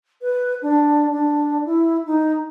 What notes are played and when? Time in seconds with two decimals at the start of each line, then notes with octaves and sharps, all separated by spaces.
0.22 B4
0.62 D4
1.11 D4
1.65 E4
2.06 D#4